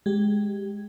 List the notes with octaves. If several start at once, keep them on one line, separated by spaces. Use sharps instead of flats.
G#3 G4